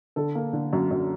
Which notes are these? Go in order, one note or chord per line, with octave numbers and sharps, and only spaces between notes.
D3 A4
A#3
D3
F#2
F#2